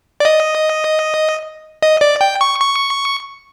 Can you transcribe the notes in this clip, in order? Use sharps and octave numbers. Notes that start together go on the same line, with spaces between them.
D5
D#5
D#5
D5
G5
C#6
C#6